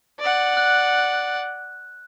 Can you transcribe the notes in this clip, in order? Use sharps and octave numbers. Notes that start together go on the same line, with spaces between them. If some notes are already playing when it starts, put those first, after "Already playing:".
D5 F#5
F#6